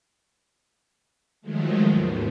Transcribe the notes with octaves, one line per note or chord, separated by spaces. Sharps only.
D#3 F3 F#3 G#3 A3
D#2 G#2 B2